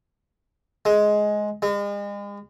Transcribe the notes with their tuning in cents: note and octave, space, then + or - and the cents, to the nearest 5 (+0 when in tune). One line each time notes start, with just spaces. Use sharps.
G#3 +10
G#3 -40